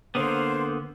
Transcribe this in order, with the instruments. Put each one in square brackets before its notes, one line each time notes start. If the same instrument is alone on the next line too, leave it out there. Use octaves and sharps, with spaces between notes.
[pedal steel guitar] D3 A#3 B3 [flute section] C5